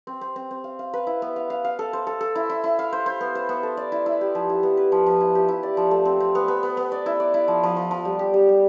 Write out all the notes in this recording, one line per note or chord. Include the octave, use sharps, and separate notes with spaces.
C4
C4
C4
C4
F5
F5
B4
E4
B3
F5
F5
F5
A4
C5
A4
A4
E4
E4
E4
F5
C5
C5
B3
C5
B3
A4
D5
E4
E4
G4
F3
E4
B3
B4
F3
F3
E4
G4
E4
D5
F3
A3
C4
C4
B3
B3
B3
B3
D5
E4
D5
E4
F3
F3
F3
F3
G3
G4
G3
G3